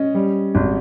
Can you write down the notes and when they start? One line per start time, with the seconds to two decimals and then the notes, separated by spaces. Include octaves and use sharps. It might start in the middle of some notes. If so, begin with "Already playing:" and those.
Already playing: C#4 D#5
0.14 G3
0.55 G#1